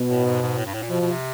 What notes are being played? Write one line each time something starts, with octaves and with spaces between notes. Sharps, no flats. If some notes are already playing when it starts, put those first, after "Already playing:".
Already playing: B2
A2
G#2
G#2
A2
G2
A2
A#2
B2 F3
B2
C3